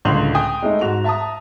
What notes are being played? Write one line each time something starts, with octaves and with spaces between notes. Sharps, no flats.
C#2 A2 D3 C6 F7 F#7
G5 G#5 D#6
G#3 A3 D#4
G#2 F#4 F7
E5 A5 A#5 D#6